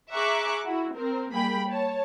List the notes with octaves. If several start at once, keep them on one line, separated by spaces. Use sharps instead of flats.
G#4 E5 A#5 C#6 D6 F#6
E4 F#4
C4 A#4
G3 A#3 G#4 G5 B5
C#5 A5